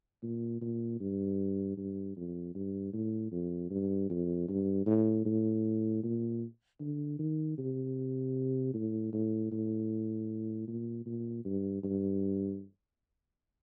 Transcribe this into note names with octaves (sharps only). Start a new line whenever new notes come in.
A#2
A#2
G2
G2
F2
G2
A2
F2
G2
F2
G2
A2
A2
A#2
D3
D#3
C3
A2
A2
A2
A#2
A#2
G2
G2